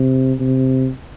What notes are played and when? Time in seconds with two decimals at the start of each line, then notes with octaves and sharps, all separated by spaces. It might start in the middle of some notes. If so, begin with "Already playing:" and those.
Already playing: C3
0.40 C3